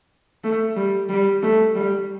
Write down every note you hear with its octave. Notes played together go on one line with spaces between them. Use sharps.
A3
G3
G3
A3
G3